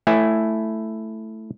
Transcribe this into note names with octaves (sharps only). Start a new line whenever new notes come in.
A3 E4 G#5